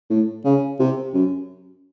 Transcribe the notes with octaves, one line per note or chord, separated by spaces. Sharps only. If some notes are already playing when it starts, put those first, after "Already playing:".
A2
C#3
C3
F#2